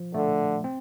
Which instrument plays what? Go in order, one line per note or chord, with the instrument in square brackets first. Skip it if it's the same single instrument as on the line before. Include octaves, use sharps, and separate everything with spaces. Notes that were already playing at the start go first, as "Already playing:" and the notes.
Already playing: [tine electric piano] F3
[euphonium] D3 [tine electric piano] A3
[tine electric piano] C4